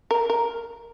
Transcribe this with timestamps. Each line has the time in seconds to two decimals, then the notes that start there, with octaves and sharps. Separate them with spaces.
0.11 A#4
0.30 A#4